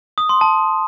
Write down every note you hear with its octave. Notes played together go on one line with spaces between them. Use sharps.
D#6
C6
A5